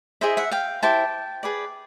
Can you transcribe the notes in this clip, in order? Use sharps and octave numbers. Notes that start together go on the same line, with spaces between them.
E4 G#4 C5 D#5 E5
E5 F#5
F5 G5
E4 G4 C5 G5 A5
G#4 B4 D5